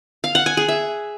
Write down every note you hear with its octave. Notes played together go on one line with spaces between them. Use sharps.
F5
F#5
G#5
G#4
E5